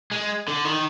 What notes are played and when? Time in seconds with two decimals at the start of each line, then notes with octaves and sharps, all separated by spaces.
0.12 G#3
0.48 D3
0.65 D#3